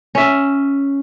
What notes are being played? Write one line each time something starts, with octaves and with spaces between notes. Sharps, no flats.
C#4 E5